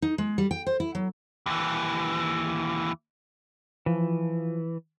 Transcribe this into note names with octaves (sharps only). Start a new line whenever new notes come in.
D#4
G#3
G3
G5
C5
E4
F#3
D#2 E3
E3 F3